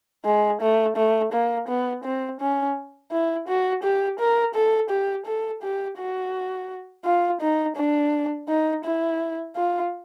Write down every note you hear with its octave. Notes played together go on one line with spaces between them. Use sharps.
G#3
A3
A3
A#3
B3
C4
C#4
E4
F#4
G4
A#4
A4
G4
A4
G4
F#4
F4
D#4
D4
D#4
E4
F4